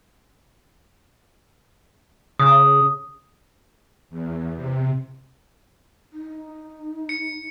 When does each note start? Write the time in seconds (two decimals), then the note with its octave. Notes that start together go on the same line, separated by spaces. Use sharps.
2.39 C#3 D#6
4.10 E2
4.56 C3
6.12 D#4
7.09 C#7